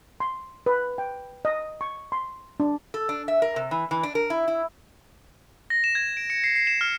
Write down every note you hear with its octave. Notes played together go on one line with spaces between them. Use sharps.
C6
B4
G5
D#5
C#6
C6
D4
A4
D4
E5
A#4
C3
E3
E3
D4
A#4
E4
E4
A#6
E7
G#6
D7
C#7
C7
C7
E7
F6